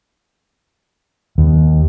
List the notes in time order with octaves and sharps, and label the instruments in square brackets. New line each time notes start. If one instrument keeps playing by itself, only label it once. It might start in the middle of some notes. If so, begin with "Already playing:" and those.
[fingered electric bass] D#2